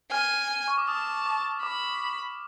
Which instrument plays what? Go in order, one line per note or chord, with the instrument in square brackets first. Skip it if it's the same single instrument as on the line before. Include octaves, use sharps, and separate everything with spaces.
[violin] G#5 [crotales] F6
[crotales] C#6
D6
[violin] A5 [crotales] D#6
[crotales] D6
[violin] B5 [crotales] D6